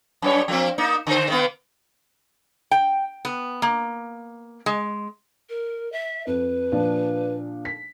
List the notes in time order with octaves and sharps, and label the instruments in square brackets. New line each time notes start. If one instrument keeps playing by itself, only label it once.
[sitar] F#2 G3 C#5
F3 A#3 C4
A#3 D#4
D3 C5
D#3 A#3 B3
[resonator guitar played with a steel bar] G5
B3
A#3
G#3
[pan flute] A#4
E5
[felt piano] F2 [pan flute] B4
[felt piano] A#2 F3 D4
B6